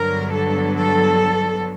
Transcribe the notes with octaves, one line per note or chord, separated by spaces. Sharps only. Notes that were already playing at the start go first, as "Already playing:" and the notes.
Already playing: G2 D3 F#3 B3 A#4
A4
A4